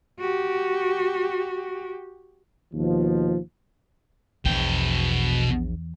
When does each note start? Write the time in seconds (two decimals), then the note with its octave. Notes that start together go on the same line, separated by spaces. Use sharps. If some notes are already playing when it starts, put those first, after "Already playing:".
0.20 F#4 G4
2.74 D#2 B2 F3
4.45 A#1 E2 B2 G5